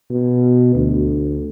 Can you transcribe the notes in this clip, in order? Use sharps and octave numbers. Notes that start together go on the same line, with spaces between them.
B2
D2